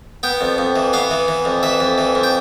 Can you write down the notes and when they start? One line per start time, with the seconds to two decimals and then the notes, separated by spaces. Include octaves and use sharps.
0.23 B3 G5
0.41 F2
0.58 F2
0.76 E3
0.93 B3 F5
1.11 E3
1.28 E3
1.45 F2
1.63 E3 E5
1.80 F2
1.98 E3
2.15 F2
2.23 G5